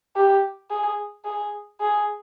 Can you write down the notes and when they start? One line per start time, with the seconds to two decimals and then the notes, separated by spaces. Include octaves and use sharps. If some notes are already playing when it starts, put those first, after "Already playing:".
0.16 G4
0.70 G#4
1.25 G#4
1.80 G#4